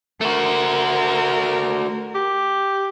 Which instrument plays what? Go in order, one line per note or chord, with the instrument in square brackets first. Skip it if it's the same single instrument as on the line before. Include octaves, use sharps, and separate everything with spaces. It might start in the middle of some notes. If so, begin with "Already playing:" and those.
[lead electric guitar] A3 F#4 [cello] A#4
[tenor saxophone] G4